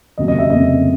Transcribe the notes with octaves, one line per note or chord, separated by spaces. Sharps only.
F1 D#2 C#3 F#3 D#5
D#5
E5
F1 D#2 C#3 F#3 D#5